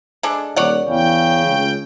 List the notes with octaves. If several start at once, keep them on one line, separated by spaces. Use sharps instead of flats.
G#3 D4 A4
D#1 C#5 D5 F#5
E2 C#3 G5
C#2